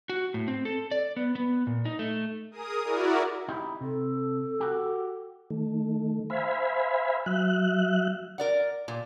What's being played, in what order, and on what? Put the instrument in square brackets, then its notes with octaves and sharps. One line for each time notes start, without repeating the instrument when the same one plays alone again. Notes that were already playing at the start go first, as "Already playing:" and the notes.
[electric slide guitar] F#4
A2
C4
A4
D5
B3
B3
A#2
D#4
A3
[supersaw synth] G#4 A#4 D#6
E4 F#4 A#4 D5
[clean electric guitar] D#4 E4 G4
[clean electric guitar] C3 [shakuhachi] A4
[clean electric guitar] F#4 G4
[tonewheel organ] D#3 A3
C5 E5 F5 G#5 B5
F#3 E5 F#6
[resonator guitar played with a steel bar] A#4 D5 F#5
A#2